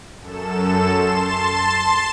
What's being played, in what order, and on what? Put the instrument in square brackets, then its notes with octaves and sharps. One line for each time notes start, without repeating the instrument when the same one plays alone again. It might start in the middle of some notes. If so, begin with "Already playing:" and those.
[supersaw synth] F#2 A4 E7
A5 C6 A6 E7